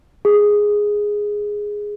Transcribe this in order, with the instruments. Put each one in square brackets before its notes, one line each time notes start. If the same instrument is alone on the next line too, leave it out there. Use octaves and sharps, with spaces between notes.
[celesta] G#4